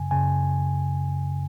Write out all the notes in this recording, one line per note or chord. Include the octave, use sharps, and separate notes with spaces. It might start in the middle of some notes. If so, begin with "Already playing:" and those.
Already playing: F#2 C#3 G#5
F#2 C#3 G#5